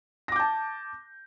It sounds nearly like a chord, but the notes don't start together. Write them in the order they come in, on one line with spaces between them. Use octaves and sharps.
A#6 D6 G6 A5